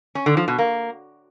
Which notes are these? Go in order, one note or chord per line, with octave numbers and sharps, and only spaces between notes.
C#4
D3
F3
B2
A#3